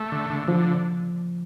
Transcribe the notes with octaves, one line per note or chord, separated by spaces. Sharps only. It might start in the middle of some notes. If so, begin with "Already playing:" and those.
Already playing: A3
D3
D3
D3 F3